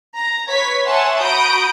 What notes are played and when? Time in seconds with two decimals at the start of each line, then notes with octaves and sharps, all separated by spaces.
0.15 A#5
0.49 B4 C#5 G#6 B6
0.84 C#5 E5 F#5 G#5 A5 C6
1.21 F#4 A#5 B5 D#6 G6 D7